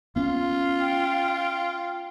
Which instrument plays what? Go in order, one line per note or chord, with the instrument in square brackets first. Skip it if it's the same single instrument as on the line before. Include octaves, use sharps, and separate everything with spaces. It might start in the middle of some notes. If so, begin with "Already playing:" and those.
[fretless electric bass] B3 C#4 [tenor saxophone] F4
[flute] G5